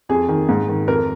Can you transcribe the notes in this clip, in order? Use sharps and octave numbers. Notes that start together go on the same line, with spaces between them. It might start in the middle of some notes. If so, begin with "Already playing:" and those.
F2 G#4
D#3
G#2
D#3
F2 A#4